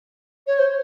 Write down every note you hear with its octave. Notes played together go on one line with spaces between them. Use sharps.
C#5
C5